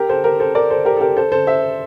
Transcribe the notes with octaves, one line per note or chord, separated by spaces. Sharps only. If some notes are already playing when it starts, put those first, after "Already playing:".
Already playing: G4 A#4
A4 C5
G4 A#4
A4 C5
A#4 D5
A4 C5
G4 A#4
A4
G4 A#4
A4 C5
A4 C5
C5 E5